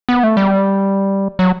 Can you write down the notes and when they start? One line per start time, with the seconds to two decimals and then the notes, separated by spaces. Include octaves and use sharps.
0.09 B3
0.23 A3
0.37 G3
1.39 F#3